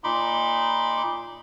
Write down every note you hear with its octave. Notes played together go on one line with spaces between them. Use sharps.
A#2 D#4 B5 C6 D6